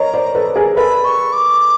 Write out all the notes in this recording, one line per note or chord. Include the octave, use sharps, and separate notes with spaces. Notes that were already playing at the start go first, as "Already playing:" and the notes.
Already playing: A#4 C#5 D#5 A#5
C5 D5
A4 B4
G#4 A#4
A4 B4 B5
C#6
D6